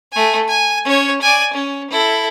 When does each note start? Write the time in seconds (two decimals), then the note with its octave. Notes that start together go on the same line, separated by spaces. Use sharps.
0.12 A3 G#5
0.47 G#5
0.85 C#4 C#5
1.22 D5 G#5
1.53 C#4
1.90 E4 A4